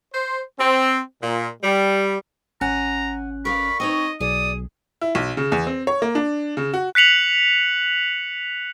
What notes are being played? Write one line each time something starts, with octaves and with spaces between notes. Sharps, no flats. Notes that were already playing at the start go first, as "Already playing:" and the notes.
C5
C4
A#2
G3
G#1 C#4 F#5 G#5 A#5 F#6
A#4 D5 F5 B5 C#6
C4 D#4 C#5 D#5
B1 G#4 D5 D#6
E4
B1
C#3
E2
C4
C#5
A#3
D4
C#3
F#4
F#6 B6 C#7 F7 F#7